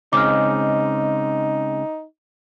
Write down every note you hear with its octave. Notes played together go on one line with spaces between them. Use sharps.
C#3 G#3 C4 D#4 D6 F6